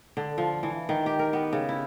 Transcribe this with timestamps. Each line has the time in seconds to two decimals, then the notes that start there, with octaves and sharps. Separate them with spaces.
0.17 D3
0.38 F3
0.63 E3
0.89 D#3
1.06 G4
1.19 A#4
1.33 B3
1.53 C#3
1.69 E4